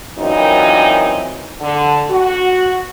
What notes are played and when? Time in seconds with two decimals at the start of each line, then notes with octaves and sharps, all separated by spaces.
0.17 F#2 A#2 E3 C4 D#4
1.61 D3
2.11 F#4